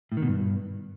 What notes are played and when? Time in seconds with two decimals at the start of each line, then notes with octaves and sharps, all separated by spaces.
0.12 A2
0.17 D#3
0.22 B2
0.28 G2